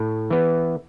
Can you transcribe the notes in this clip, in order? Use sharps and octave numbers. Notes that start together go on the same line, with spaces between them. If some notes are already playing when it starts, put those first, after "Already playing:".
Already playing: A2
E3 B3